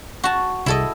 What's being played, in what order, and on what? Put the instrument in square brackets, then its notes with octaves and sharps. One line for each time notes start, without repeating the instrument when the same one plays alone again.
[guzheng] F#4 A5
[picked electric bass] C2 [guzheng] E4 A4 D#5